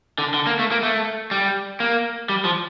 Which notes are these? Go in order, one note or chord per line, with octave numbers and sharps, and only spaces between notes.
D3
D3
A#3
A3
A#3
A3
G3
A#3
G3
F3